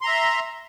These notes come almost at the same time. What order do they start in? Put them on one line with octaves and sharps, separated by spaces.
C6 A#5 E5